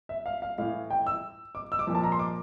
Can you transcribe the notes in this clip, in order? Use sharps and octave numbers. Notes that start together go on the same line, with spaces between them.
E5
F5
F5
A2 E3 F5
G5
E6
D6
E6
D6
A#2 F3
A5
A#5
C6
D6